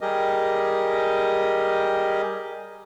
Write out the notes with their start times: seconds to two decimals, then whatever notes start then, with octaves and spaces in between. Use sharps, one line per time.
0.01 G3 G4 G#4 A#4 D#5